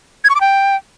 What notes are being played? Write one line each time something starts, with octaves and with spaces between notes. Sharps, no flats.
G#6
C#6
D6
G5